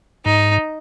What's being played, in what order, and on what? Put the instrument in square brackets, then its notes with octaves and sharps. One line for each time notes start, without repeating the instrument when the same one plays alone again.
[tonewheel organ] G#2 [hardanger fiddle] D#4